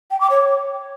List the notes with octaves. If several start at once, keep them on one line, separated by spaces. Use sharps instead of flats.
G5
D6
C#5